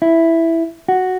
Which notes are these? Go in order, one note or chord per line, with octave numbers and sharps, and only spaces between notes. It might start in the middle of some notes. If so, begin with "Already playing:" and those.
E4
F#4